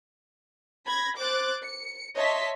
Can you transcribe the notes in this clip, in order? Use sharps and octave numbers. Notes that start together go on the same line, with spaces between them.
B5 G#6 A#6
C5 D6 F#6 A6
C#7
C#5 D#5 E5 A5 C6 B6